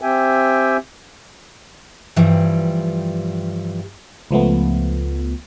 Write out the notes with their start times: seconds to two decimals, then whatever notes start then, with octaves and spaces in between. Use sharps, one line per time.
0.02 C4 G4 E5 G5 G#5
2.16 G2 E3 F3 G3
4.31 C#2 F3 A3 B3